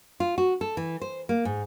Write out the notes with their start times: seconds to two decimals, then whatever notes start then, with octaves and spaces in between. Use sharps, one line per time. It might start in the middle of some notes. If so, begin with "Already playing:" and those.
0.20 F4
0.38 F#4
0.61 A4
0.77 E3
1.02 C5
1.29 A#3
1.45 G#2